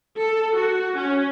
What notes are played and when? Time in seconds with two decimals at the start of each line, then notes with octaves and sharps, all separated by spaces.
0.17 A4
0.56 F#4
0.97 C#4